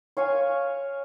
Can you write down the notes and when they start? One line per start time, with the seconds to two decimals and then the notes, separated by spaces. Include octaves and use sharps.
0.17 C#5 F5 G#5 C#6